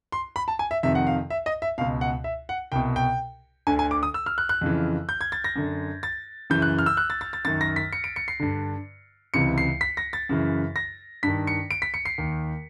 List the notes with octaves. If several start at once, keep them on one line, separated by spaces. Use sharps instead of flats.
C6
B5
A5
G#5
E5
F2 C3 D#3 E5
F#5
F5
E5
D#5
E5
C#2 B2 F5
F#5
E5
F#5
C2 B2 G5
G5
D2 D3 G#5
G#5
D6
D#6
E6
F6
F#6
F#6
F2 C#3 E3
G6
G#6
A6
A#6
F#2 D3
A6
F#2 C#3 E3 G6
F#6
F6
E6
F#6
A6
A6
A6
F#2 D#3 A6
A#6
B6
C#7
D7
C#7
C7
G2 D3
C#2 C3 E3 C#7
C7
B6
A#6
A6
F#2 C#3 E3
A#6
G2 D#3 B6
C#7
D7
B6
C#7
C7
D#2 D#3